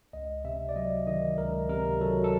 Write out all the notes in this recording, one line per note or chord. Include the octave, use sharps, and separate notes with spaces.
C#2 D#5
C3 E5
D5
F#3 D#5
D#3 D#5
C#2 A#4
C3 A#4
F#3 A4
A4